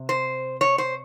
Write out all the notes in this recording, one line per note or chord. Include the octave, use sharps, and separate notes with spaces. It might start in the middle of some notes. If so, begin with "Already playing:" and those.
Already playing: C3
C5
C#5
C5